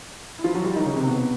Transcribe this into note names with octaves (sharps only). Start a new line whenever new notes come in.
E4
F3 F4
F#3 F#4
G3 G4
D#3 D#4
C#3 C#4
C3 C4
B2 B3